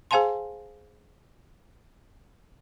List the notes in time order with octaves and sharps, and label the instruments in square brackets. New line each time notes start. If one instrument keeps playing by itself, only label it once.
[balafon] G#4 C5 F5 G#5 A5 C6